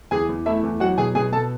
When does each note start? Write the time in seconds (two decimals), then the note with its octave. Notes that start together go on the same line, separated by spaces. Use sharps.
0.11 E2 G#4 G#5
0.29 E2
0.46 A3 E4 E5
0.63 E2
0.80 F#3 F#4 F#5
0.98 B2 G#4 G#5
1.15 B2 G#4 G#5
1.32 B2 A4 A5